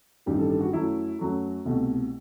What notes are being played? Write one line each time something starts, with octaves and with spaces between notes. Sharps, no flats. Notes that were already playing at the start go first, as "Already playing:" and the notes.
A1 G2 D#3 G3 G4
A4
A4
F#4
F#2 F#3 A3 E4
F#2 F#3 A3
C2 B2 A3